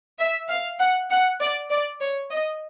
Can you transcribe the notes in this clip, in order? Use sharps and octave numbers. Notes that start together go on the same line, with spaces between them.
E5
F5
F#5
F#5
D5
D5
C#5
D#5